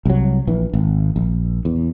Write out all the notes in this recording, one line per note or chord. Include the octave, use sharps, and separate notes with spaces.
C2 F#3
A#1 E3
G#1
A#1
E2